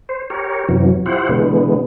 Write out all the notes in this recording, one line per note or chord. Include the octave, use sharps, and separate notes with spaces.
C5
G4 A#4 C#5
F#2 C3 E3 F#3
E4 F4 G4 C5 F#5
B2 D3 E3 G#3 B3